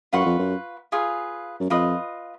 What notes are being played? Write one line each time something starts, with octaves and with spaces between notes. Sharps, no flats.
F#2 F4 B4 F#5 C#6
F2
F#2
F4 G#4 B4 F5
F#2
F2 F4 B4 D#5